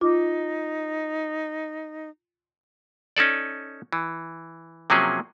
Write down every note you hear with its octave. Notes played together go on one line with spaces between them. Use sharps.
D#4 F4 D6
C#4 D#4 A4 D5
E3
C3 F3 F#3 A#3 C#4 G#4